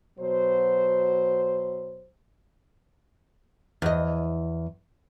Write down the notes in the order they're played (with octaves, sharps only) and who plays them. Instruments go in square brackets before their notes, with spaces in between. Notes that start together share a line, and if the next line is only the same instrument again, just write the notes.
[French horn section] B2 F#3 C5
[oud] E2 D#5